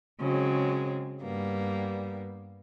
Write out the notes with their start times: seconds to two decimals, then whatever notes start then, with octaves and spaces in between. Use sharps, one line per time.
0.19 C#3 F#3 G#3 C4
1.21 G2 G3 A#3 B3